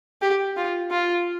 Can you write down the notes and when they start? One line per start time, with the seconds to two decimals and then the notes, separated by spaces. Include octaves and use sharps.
0.22 G4
0.57 F4
0.91 F4